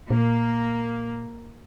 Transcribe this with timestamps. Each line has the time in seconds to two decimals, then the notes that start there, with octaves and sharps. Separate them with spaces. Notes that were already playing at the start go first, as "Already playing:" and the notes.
0.10 A#2 A#3